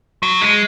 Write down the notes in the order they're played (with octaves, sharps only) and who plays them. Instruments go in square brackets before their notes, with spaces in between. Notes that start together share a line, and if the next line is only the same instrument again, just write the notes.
[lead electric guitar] F#3
G#3